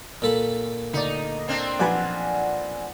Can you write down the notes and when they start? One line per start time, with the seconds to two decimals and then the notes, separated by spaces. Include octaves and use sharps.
0.22 A#2 A4 B5
0.93 D2 D#4 D5
1.48 A#3 C4 D4
1.79 B1 F3 B4 D5 F#5 G#5